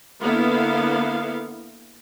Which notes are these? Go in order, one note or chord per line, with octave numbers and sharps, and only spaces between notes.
D3 A#3 B3 E4 F5